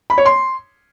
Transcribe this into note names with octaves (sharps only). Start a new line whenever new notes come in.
B5
C#5
C6